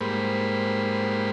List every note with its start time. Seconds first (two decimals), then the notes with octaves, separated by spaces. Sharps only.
0.01 G#2 G3 A#3 C5 B5